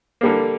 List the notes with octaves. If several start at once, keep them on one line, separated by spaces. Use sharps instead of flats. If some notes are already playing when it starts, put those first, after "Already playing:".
D3 G3 A#3